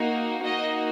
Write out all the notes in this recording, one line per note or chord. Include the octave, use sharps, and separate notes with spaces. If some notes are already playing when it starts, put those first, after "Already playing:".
Already playing: A#3 D#4 F#4
A#3 D#4 F#4 D#5